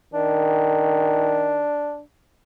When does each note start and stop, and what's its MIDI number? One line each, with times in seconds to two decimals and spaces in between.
0.14 1.65 51
0.14 2.00 62